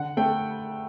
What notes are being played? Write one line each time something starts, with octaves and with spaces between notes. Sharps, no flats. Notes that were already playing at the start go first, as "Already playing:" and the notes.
Already playing: D3 F#5
A3 G5